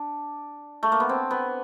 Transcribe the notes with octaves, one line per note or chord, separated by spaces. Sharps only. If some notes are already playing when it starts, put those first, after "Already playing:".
Already playing: D4
A3
A#3
B3
C4
B3